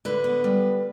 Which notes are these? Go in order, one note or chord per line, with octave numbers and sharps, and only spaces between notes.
D3 B4
B3
G3